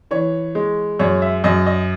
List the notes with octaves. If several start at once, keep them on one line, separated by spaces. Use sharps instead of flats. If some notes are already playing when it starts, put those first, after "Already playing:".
E3 C#5
G#3
F#2 C#5
E5
F#2 D#5
D#5